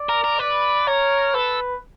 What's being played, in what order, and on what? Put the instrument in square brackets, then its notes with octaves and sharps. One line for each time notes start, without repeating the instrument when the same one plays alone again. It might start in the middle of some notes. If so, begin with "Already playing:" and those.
Already playing: [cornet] D5
[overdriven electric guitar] A#4
A#4
[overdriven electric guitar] B4 [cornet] D5
[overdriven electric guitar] A#4 [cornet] C#5
[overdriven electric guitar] A4 [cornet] B4